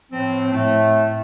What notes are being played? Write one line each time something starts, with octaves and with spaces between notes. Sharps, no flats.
A2 F3 C4
A2 A3